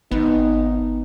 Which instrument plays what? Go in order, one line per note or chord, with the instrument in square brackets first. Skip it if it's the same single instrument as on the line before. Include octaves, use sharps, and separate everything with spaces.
[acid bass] G#1 [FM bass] B3 [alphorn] D#4